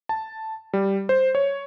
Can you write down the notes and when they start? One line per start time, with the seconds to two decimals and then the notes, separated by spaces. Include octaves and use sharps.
0.09 A5
0.73 G3
1.09 C5
1.35 C#5